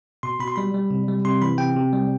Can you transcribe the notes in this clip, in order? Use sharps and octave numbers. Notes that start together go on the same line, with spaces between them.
B2 C6
B2 B5
C6
G3 B5
G3
C3
G3
C3 C6
E3 B5
C3 G5
C3
G3